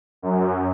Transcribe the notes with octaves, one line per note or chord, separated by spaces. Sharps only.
F#2